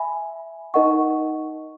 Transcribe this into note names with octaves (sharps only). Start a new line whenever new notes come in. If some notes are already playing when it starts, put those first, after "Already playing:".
Already playing: E5 G#5 B5
D#4 A#4 D#5 F#5 C#6